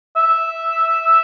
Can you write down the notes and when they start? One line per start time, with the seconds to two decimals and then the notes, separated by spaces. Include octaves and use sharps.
0.16 E5